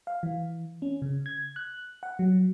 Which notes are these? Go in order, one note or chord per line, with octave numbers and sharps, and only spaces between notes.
F5
E3
C#4
C#3
G#6
F#6
F#5
F#3